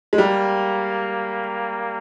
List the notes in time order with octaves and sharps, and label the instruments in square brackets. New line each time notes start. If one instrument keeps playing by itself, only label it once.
[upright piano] G#3
[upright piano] G3 [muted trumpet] A#3